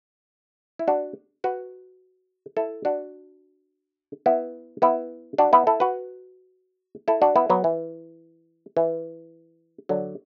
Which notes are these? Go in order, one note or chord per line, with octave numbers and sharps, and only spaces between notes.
E4
D4 F#4
F#4 B4
E4 A4
D4 F#4
B3 E4
B3 E4
D4 F#4
B3 E4
E4 A4
F#4 B4
E4 A4
D4 F#4
B3 E4
F#3 B3
E3
E3
D3 F#3